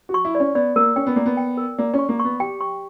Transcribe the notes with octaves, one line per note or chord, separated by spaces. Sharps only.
F#4
C#6
E4
D5
C#4
B3 D5
A#3 A#4
C#4 G5
B3
A#3 D5
B3
G5
A#4
A#3 D5
C#4
C#6
A#3
B3 C#6
G4 G5
C#6